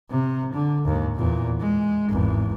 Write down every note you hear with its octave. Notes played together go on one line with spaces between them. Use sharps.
C3
D3
D#2 G#2
E2 A#2
G#3
G#1 E2